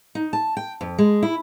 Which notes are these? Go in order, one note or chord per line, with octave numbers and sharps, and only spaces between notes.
D#4
A5
G5
F2
G#3
E4